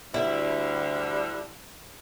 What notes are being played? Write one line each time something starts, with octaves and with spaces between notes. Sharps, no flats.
D2 D3 G3 E4